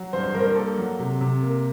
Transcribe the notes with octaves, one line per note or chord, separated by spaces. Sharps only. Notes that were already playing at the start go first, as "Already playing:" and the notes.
Already playing: F#3
G2 C5
C5
G2 A#4
C5
A#4
A#3 A4
F#3
C3
C3
A#3